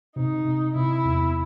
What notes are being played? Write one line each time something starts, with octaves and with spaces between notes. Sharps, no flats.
C3 D#4
C3
C3 E4
E2